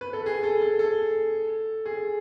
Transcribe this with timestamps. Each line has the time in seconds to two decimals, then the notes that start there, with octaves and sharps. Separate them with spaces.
0.01 B4
0.13 A4
0.26 G#4
0.43 A4
0.61 A4
0.79 A4
1.86 G#4